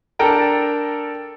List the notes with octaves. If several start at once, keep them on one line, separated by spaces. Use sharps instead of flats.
D4 A4 A#4 G5 A5 A#5